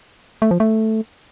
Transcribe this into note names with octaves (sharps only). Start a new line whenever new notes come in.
A3
F3
A3